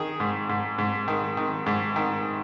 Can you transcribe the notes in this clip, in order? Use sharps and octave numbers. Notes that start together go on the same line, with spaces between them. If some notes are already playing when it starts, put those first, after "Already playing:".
Already playing: D#3 G#4
G#2
G#2
G#2
D#3
D#3
G#2
D#3